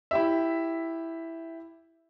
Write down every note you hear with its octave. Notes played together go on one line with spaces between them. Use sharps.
E4 G4 E5